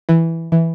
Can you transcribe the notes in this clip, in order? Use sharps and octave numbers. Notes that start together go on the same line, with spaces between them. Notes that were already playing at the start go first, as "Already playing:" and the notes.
E3
E3